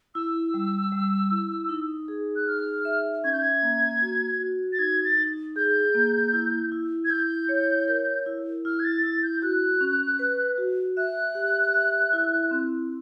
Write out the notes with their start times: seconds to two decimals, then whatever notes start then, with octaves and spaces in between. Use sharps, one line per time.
0.15 E4 E6
0.54 G3
0.92 G3
1.31 E4
1.69 D#4
2.08 G#4
2.36 F#6
2.47 D#4 F6
2.85 E5
3.24 C#4 G#6
3.32 G6
3.41 G#6
3.62 A#3
4.02 F#4
4.40 F#4
4.73 A6
4.78 D#4 G#6
5.04 A6
5.18 D#4
5.56 G#4 G6
5.94 A#3
6.33 E4
6.72 E4
7.05 G#6
7.10 E4 G6
7.49 C#5
7.88 A#4
8.26 E4
8.65 E4 F6
8.79 G#6
8.84 A6
9.03 E4 A6
9.23 G6
9.42 F#4 F#6
9.81 C#4
10.19 B4
10.58 F#4
10.97 E5 F#6
11.35 G4
11.74 E5
12.13 E4
12.51 C4